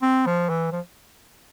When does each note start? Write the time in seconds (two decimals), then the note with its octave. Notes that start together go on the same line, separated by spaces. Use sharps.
0.02 C4
0.26 F3
0.49 E3
0.72 F3